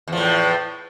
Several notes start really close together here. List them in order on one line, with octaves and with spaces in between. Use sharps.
E2 F3 A2